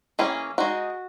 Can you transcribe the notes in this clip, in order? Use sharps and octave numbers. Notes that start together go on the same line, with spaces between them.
E3 A#3 C#4 G#4
G#3 D#4 F#4